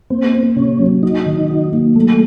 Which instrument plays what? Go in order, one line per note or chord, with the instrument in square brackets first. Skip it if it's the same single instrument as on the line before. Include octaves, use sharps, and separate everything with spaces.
[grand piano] A#3 [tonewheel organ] C4
[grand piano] A#3
[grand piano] C3 [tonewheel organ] C#4
[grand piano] F#3
[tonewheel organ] D#4 [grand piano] F#4
[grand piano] D#3
F#4
A#3
[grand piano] F#3 [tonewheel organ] A3